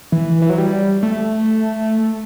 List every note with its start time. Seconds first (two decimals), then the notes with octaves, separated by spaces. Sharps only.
0.12 E3
0.42 E3
0.50 F#3
0.58 G3
1.03 A3